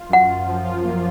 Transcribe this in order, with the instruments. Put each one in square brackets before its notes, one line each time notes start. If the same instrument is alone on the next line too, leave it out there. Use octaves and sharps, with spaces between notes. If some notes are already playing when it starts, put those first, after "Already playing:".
Already playing: [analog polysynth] F4
[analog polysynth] F#2 [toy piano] F#5
[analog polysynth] F4
F3
F4
A#3